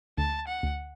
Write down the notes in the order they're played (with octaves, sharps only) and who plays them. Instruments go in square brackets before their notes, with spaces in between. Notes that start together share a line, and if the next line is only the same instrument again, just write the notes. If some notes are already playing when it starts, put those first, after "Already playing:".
[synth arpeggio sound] D2 [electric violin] A5
[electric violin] F#5
[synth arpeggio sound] D2